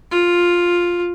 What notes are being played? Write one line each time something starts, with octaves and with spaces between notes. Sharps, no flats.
F4